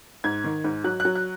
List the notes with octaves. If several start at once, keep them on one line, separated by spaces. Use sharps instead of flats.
G#2 G#6
D#3
G#2
F#3 F#6
F#6
F#3
F#6